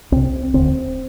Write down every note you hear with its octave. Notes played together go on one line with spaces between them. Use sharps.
C2 C3 C4
E1 D2 D3 C4